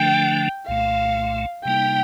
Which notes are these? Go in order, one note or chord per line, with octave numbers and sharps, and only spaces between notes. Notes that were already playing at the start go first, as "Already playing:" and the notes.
Already playing: D3 F3 A3 D4 G5
C2 A#2 A3 F5
C3 G3 A#3 D#4 G5